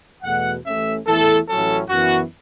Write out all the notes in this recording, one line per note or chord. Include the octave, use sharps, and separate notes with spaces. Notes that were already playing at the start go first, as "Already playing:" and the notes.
E2 B2 A3 F#5
A1 A2 A3 C#4 E5
E2 E3 A3 E4 A4
A1 A2 F#3 C#4 A4
F#2 E3 B3 F#4